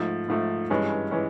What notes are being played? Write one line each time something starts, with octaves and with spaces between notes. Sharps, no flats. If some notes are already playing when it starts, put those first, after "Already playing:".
Already playing: G#2 F3 A3
G#2 F3 A3
G2 E3 G#3 C#4
E3 G#3 C#4